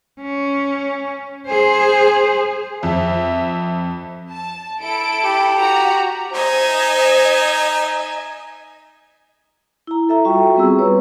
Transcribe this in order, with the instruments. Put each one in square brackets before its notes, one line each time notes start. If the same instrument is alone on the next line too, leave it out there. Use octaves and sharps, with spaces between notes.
[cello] C#4
G#4 C5
[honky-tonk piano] F2 [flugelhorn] E5
[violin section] A5
E4 A4 D7
[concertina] G4
[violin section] F#4 A#5
[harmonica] D#4 [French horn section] C5 [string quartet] D#5 E5 G#5
[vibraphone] E4 A#5
A4 E5 A#5
G3 F4 F#4 E5 G5 C#6
G3 B3 C4 G#4 E6
B4 C#5 A#5